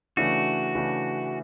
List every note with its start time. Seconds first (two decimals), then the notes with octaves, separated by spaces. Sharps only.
0.17 C#3 E3 A3 D4 F#4
0.75 C#3 E3 A3 D4